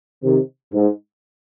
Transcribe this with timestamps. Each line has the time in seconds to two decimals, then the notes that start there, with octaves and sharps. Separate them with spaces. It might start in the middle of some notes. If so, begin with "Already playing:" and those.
0.23 C3 D#3
0.73 G#2